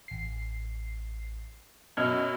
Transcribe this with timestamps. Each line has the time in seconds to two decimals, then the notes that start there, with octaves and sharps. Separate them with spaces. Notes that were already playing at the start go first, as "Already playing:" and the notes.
0.08 A1 C7
1.97 F#2 B2 D#5 F6 G#6